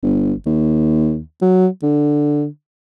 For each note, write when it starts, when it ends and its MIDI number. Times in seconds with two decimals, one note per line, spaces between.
0.03 0.33 31
0.46 1.20 39
1.42 1.67 54
1.83 2.46 50